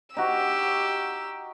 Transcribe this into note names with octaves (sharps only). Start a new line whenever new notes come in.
D#4 F#4 G4 E6